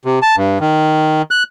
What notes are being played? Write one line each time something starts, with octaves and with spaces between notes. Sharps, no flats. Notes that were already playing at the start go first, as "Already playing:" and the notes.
C3
A5
G2
D#3
F#6